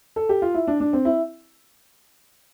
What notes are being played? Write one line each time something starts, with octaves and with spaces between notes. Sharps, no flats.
A4
G4
F4
E4
D4
D4
C4
E4